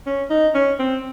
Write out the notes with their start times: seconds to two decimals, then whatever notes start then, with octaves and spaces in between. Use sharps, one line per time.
0.06 C#4
0.30 D#4
0.55 C#4
0.79 C4